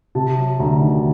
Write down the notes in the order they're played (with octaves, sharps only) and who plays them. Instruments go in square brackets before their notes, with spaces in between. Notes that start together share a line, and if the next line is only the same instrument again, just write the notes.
[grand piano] C3 A5
F#3
D2 A#5
D#3